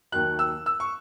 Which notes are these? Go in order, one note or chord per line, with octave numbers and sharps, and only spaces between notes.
D#2 D#3 F#3 F#6
E6
E6
C#6